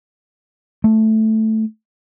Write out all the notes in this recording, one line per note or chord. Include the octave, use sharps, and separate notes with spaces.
A3